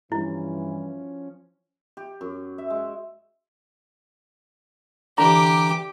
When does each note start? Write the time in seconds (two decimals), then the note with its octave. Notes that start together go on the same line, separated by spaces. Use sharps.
0.12 G2 E3 F3 C#4 E4
1.97 G4
2.21 F#2
2.58 E5
2.70 G#3
5.18 D3 E3 G4 A#5 D6